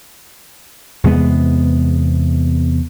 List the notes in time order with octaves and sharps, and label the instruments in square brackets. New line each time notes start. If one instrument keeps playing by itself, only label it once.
[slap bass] E2 C3 G#3 B3